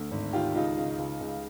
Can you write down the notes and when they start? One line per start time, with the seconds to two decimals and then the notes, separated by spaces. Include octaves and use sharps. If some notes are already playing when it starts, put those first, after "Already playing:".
Already playing: D2
0.11 G#1
0.33 D#3 F4 G4
0.55 C#2 D#4 F4
0.78 C#3
0.98 C#2
1.21 C#2